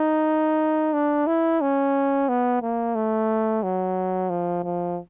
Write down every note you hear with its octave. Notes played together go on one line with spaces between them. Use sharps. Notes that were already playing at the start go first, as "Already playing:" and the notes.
Already playing: D#4
D4
E4
C#4
B3
A#3
A3
F#3
F3
F3